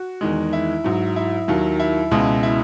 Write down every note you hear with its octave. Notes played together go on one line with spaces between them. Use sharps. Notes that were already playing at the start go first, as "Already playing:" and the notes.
Already playing: F#4
E2 D#3 G#3
E4
G#2 F#3
E4
D#2 D#3 F#3
E4
C#2 B2 G#3
E4